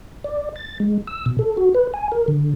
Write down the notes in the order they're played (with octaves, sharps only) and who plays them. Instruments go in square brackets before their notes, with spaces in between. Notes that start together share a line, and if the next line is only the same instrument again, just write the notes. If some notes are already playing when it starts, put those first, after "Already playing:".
[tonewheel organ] D5
A6
G#3
E6
B2
A4
F#4
B4
G#5
A#4
D3